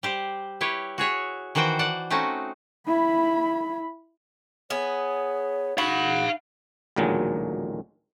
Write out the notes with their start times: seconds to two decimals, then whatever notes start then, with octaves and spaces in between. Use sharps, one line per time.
0.03 G3 G4 C5
0.61 E4 G4 B4 C#5
0.98 F#4 G#4 C#5 E5
1.55 D#3 E3 F#4 C5 G5
1.79 D5 F#5 A5
2.10 A3 C4 C#4 D#4 F#4
2.87 E4 B5
4.70 B3 G#4 C#5
5.78 D#4 F#4 F5 B5
6.96 A1 D2 A#2 D#3 F#3 G#3